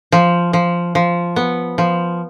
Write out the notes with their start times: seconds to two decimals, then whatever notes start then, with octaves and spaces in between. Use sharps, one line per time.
0.12 F3
0.53 F3
0.95 F3
1.36 B3
1.78 F3